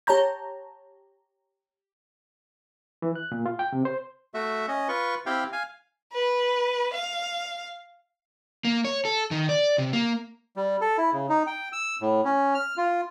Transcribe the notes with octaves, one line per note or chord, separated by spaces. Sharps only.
G4 C#5 A5 A#5 G6
E3
F#6
A#2
F4
G5
C3
C5
A3 F#4 E5
C#4 D#5
F4 B4 C#6
C4 E4 G4 F5 G5
F5 G#5
B4
F5
A#3
C#5
A4
D#3
D5
C3
A#3
G3
A4
E4
C#3
D#4
G5
E6
A2
C#4
F6
F4